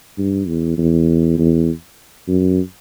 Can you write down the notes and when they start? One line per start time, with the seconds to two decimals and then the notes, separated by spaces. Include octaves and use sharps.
0.18 G2
0.48 E2
0.78 E2
1.38 E2
2.28 F#2